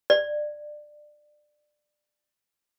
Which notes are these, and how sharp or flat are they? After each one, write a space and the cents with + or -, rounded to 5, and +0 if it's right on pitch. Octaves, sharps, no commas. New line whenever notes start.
D5 +20